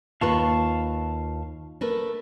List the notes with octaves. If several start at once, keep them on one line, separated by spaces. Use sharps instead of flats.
D#2 F4 B4 F5 A5 C#6
A3 A#4 B4